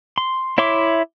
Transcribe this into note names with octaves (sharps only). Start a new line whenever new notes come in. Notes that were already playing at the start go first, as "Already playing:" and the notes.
C6
E4 C#5 E5 C6 D6